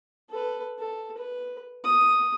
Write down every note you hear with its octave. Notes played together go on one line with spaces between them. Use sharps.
A4 B4
A4
B4
D#6